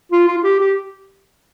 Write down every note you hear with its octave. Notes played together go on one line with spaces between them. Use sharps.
F4
F4
F4
G4
G4